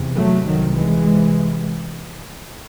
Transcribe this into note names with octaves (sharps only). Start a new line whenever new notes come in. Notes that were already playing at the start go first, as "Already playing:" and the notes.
Already playing: E2 C3
F#3 A3
C2 C3 D#3 F#3
E3 G#3
C3